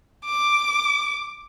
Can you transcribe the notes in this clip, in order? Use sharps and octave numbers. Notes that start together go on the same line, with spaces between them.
D6